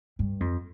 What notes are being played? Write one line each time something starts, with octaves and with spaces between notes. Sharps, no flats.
G2
F2